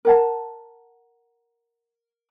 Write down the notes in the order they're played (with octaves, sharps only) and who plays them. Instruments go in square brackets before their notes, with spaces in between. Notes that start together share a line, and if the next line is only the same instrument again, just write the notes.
[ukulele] A#4 F#5 A5